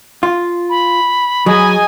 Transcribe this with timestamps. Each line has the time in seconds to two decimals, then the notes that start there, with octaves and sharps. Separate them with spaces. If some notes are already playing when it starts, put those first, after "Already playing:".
0.23 F4
0.70 B5
1.46 F#3 G#4 D#5 G#5